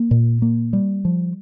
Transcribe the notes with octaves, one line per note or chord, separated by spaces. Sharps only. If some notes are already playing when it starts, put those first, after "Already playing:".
Already playing: A#3
A#2
A#3
G3
F3